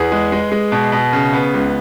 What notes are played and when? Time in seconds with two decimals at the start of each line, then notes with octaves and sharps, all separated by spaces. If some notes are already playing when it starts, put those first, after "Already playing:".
Already playing: E2 G#4 B4
0.12 G#3
0.32 G#3
0.52 G#3
0.72 B2
0.92 B2
1.13 C#3
1.33 B3
1.54 C#2